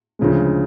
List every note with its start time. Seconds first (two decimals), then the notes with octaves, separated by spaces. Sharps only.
0.19 D2 C#3 F3 G#3